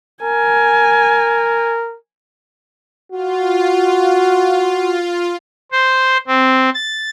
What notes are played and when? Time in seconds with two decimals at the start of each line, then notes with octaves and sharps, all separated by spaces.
0.22 A#4 G#5
3.12 F4 F#4
5.72 C5
6.27 C4
6.74 A6